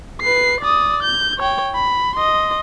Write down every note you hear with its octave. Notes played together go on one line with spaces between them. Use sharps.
B4 C7
D5 D#6
G6
C#5 G5
B5
D#5 C6